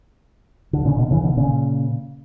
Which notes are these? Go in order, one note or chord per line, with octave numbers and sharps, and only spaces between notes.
D3
A#2 C#3
B2 D3
C#3 E3
B2 D3
A#2 C#3